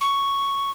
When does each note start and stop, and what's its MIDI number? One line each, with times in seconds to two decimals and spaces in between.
0.01 0.71 85